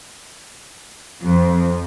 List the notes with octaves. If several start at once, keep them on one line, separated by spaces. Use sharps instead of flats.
F2